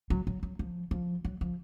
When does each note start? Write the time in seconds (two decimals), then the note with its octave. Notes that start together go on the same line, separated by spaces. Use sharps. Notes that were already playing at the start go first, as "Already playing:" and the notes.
0.10 F#3
0.27 F#3
0.43 F#3
0.59 F3
0.91 F3
1.24 F#3
1.41 F3